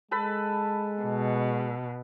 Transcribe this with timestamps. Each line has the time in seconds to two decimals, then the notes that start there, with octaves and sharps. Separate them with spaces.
0.11 G#3 A4 B4 B5
1.02 B2